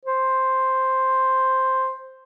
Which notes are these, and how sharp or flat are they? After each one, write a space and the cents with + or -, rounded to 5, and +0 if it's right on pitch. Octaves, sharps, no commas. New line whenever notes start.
C5 +0